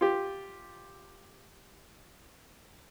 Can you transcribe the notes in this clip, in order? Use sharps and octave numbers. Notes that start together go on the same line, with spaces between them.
F4 G4